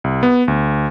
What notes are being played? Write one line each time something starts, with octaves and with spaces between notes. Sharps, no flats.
C2
B3
D2